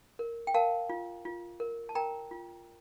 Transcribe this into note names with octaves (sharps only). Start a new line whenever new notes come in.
A#4
G5
A#4 F5 A5
F4
F4
A#4
A5
A#4 G5 A#5
F4